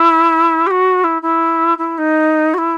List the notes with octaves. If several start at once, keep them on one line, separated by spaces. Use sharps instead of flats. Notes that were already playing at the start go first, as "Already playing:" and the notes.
Already playing: E4
G4
F#4
E4
E4
E4
D#4
F#4
E4